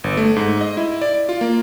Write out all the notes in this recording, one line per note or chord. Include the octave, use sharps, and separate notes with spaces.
G1
A3
G#2
D#5
E4
D5
F4
A#3